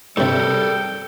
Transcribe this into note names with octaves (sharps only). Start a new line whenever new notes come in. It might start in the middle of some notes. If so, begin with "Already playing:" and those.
G2 C3 G3 A4 A#4 G5